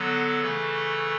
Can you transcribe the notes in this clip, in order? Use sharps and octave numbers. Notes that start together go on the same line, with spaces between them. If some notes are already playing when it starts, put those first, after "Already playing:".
Already playing: D3 F#3 B3 A4
C#3 E3 A3